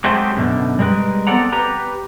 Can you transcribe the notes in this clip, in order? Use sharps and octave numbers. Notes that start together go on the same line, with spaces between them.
F#3 G#3 A3 C4 G4 C5
F#2 B2 D3
G3 G#3 A#4 B4
B3 C4 A4 D5 F#5 A#5
G4 B4 A#5